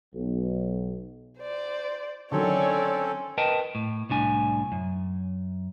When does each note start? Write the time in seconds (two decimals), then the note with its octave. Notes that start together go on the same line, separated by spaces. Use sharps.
0.13 B1
1.39 C5 D5
2.32 D3 D#3 F#3 C4 C#4 A4 C#5 D5
3.38 A#4 B4 D#5 G5 A5
3.75 A2
4.10 C2 A2 D4 G#5
4.72 F#2